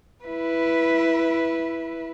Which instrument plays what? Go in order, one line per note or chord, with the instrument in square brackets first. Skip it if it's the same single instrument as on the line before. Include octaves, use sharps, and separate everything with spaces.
[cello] E4 B4